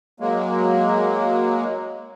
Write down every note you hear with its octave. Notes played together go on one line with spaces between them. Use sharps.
F#3 G#3 A#3